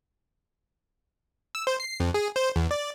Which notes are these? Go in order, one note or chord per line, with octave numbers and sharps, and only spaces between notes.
E6
C5
C7
F2
G#4
C5
E2
D5